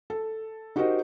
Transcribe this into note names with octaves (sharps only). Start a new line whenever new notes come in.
A4
D#4 F#4 G4 A#4 C5 D#5